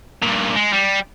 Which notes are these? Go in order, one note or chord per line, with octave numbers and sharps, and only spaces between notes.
G2 A#2
G#3
G3